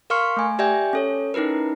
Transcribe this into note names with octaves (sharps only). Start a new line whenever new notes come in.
A#4 F5 C6 C#6 F6 C#7
A3 G#5
G4 D5 E5 G5 G#5 G6
C#4 A4 C#5
C#4 D#4 E4 A#4 B4